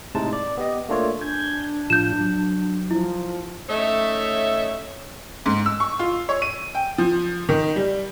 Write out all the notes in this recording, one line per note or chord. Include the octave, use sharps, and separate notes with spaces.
A2 C3 G#3 D#4 A5
D5
B3 G4 D#5
A3 A#3 D4 F4 A4 C#5
D4 G#5 G6 G#6
A2 F3 F4 G6 E7
F#3
F3 E4
A3 C#4 D#4 C#5 E5
G#2
E6
C#6
F4
C#5
D#7
G5
F3
D#3
G3